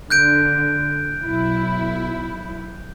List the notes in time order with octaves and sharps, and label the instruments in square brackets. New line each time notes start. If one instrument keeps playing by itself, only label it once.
[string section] D3 [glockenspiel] F#6 G6 D7
[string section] B1 E4